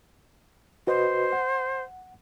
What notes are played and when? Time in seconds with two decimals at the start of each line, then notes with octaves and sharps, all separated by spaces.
0.87 F#4 B4 C5 D#5
1.32 F#5